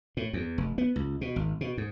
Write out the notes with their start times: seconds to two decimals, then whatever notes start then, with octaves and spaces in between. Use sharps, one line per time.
0.17 A2
0.33 E2
0.58 F1
0.78 B3
0.96 C#2
1.21 B2
1.36 G#1
1.61 B2
1.78 G#2